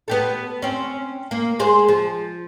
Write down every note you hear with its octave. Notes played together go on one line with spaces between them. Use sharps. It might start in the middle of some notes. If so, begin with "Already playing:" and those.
B3 G4 A4
C4 C#4
A#3
G#3 G#4 C5
F3